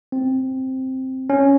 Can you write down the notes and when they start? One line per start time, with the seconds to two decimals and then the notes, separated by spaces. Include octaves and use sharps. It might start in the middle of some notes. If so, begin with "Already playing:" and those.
0.12 C4
1.30 C#4